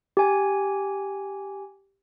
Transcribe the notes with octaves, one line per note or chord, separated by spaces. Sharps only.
G4 G#5